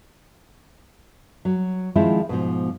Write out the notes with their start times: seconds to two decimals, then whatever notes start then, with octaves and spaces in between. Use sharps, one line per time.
1.45 F#3
1.95 D#3 F3 G#3 C4 E4 F4
2.29 G#2 B2 F3